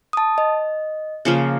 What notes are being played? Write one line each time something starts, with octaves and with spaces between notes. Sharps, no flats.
A5 D#6
D#5
C#3 F3 A#3